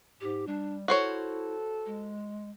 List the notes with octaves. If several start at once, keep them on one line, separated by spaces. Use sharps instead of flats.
G#2 G4
G3 D4
E4 F#4 A4 C5 C#5
G#3